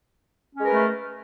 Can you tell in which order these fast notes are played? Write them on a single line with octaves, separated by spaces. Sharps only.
C#4 G#3 A#4 B4 A3